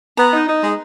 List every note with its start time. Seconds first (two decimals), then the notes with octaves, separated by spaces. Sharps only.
0.17 B3 A#5
0.33 D#4
0.47 D#4
0.63 G#3